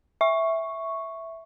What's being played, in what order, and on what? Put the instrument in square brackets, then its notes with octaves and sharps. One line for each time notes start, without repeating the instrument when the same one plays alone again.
[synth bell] E5 C#6